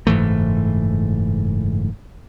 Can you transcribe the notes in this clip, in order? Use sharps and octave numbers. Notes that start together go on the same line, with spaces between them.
F#1 G#2 E3 A3